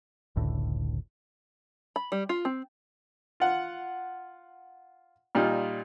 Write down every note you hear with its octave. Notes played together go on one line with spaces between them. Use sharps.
F#1 C#2 A2 D3
B5
G3
F4
C4
F4 F#5
A#2 G3 D#4 F4